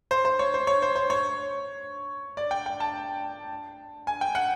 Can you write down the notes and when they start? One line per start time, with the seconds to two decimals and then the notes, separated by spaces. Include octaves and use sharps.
0.11 C5
0.25 C5
0.39 C#5
0.54 C5
0.67 C#5
0.82 C5
0.96 C5
1.10 C#5
2.37 D5
2.51 G5
2.66 G5
2.80 A5
4.07 G#5
4.21 G5
4.35 F#5